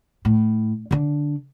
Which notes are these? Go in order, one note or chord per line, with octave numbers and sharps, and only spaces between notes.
A2
D3 D4